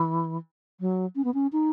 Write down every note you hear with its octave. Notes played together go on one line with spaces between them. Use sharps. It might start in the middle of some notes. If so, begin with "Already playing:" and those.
Already playing: E3
F#3
C#4
B3
C#4
D#4